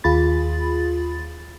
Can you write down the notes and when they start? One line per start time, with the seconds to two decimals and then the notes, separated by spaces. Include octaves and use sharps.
0.04 D#2 F4 G#4 B5 A6